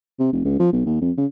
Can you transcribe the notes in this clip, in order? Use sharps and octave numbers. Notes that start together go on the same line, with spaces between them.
C3
F1
C#2
F3
B1
D#2
F2
C#3